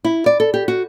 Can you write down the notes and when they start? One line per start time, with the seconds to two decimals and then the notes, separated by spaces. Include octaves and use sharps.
0.04 E4
0.26 D5
0.40 A4
0.54 G4
0.68 F#4